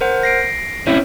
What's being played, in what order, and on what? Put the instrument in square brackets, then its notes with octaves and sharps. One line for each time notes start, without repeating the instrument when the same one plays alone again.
[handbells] A#4 C5 F#5
A#6 C7 D7
[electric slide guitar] C4 C#4 E4